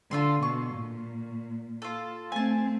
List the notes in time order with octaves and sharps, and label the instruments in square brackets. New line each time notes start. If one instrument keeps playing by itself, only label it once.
[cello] D3 [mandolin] F4 A4 C6
[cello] B2 [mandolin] C#6
[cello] A#2
[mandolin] F4 A4
[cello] A3 C4 [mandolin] G#5 A5